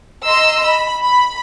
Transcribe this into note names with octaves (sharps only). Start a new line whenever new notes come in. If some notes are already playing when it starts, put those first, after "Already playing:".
D#5 A#5 C6 E6
B5
B5